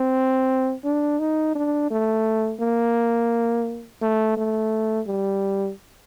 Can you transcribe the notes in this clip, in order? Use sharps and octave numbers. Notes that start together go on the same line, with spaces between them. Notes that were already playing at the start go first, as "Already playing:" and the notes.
Already playing: C4
D4
D#4
D4
A3
A#3
A3
A3
G3